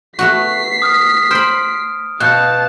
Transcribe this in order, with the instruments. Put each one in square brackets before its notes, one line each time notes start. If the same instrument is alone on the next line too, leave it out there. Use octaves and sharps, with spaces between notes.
[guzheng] A3 B3 F#4 [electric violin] B6 C7
[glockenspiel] D#6 F6
[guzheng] C5 B5 [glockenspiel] F6 D7
[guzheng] B2 [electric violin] F5 A5 [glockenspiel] F#6 G6 C#7